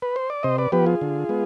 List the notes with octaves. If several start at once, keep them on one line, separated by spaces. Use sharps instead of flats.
B4
C5
D5
C3 C5 D#5
B4 D5
F3 B3 G4 B4
F4 G#4
D3
G#3 B3